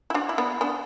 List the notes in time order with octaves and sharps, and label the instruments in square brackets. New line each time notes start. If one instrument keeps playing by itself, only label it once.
[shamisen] E4
D4 F#4
E4
B3 D4
B3 D4